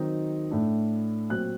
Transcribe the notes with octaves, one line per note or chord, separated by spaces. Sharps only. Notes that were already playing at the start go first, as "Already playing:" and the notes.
Already playing: D#3 F#3 C4 D#4
A2 A3 D4
A#2 F#3 C4 F#6